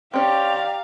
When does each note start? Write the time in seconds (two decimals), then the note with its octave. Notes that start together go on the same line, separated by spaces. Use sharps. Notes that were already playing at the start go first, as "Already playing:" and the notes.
0.14 C4 C#4 G4 D5 F5 A#5